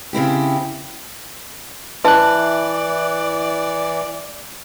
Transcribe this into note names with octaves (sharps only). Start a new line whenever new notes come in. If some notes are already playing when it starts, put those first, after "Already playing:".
C#3 C4 E4 G4
E3 E4 B4 D5 E5 A5 F#6